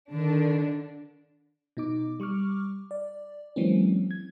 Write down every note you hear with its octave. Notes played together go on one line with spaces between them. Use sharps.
D3 D#3 D4
B2 D#4 D6
G3 C#6 D6 F6
D5
E3 F#3 G#3 A#3 C4 C#4
G#6